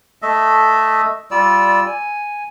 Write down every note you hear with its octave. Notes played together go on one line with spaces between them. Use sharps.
A3 A4 D#5 E5
G3 F4 D5 E6
G#5